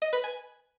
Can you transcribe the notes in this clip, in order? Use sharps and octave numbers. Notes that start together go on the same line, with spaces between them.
D#5
B4
G#5